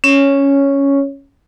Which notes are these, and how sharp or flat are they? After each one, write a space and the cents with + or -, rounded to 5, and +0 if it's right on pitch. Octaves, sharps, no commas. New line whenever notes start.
C#4 +0 C#5 +0